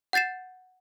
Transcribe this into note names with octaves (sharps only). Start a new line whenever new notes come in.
F#5 G6 A6 C7 E7